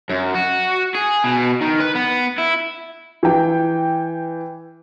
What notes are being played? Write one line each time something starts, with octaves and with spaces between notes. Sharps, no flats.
F#2
F#4
G#4
B2
D#3
B4
B3
E4
E3 G5